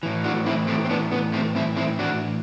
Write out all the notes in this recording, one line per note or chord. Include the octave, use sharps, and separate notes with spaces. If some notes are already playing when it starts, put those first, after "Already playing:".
A2 E3
D4 F#4
C4 E4
A3 C4
C4
B3 D4
B3
A3 C4
C4 E4
C4 E4
D4 F#4